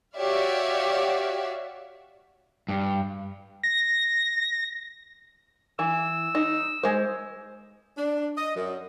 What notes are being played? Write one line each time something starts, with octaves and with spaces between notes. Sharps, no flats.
F#4 G4 C#5 D5 E5 F5
G2
A#6
E3 E6
D#4
G#3 C5
D4
D#5
F#2